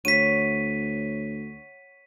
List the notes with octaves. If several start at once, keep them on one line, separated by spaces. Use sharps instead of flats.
D2 C#5 F#5 B6 D#7